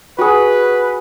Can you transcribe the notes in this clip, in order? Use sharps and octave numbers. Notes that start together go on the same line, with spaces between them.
F#4 G#4 B4